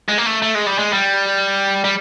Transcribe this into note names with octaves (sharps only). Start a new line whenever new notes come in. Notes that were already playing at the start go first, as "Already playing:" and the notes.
G#3
A#3
A3
A3
G#3
G3
G#3
G3
G3